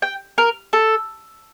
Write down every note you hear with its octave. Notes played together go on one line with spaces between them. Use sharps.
G5
A#4
A4